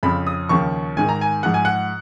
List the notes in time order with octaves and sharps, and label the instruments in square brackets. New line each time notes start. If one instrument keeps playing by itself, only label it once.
[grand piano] F2 C#3 F3 B5
D#6
D#2 C#3 F3 C#6
G#2 D#3 G#5
A#5
G#5
G#2 F3 F#5
G#5
F#5